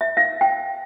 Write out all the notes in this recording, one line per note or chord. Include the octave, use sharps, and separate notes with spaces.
E5
F5
G5